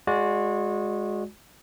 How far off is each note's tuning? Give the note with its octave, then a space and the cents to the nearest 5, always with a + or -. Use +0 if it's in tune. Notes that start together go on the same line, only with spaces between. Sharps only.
G#3 +0 F#4 -25 D5 -20